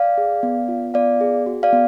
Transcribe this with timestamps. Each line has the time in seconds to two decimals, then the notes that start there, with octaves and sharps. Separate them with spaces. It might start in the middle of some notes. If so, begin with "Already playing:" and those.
Already playing: D5 F5
0.18 G#4
0.43 B3
0.68 F4
0.94 B3 D5 F5
1.21 G#4
1.46 F#4
1.63 D5 F5
1.73 B3